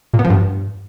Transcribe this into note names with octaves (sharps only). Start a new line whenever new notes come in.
A#2
B3
F3
G2